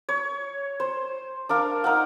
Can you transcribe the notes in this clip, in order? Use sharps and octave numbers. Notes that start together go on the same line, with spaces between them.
C#5
C5
D4 A#4 F5
D#4 A#4 F5 F#5